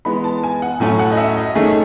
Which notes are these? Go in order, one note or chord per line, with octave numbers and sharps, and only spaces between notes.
E3 G#3 B3 B5
A5
G#5
F#5
A2 F#3 A3 C#4 G#5
F#5
D#5
E5
D#5
D#3 A3 C#4 G#4